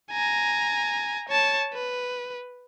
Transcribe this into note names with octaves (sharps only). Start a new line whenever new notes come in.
G#5 A#5
C#5 A5
B4